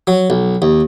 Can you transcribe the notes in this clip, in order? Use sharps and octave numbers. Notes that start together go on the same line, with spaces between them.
F#3
B1
D#2